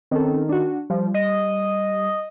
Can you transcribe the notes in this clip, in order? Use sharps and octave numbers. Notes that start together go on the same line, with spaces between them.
D#3 C4 C#4 A4
D4 F#4
F3 G3
D#5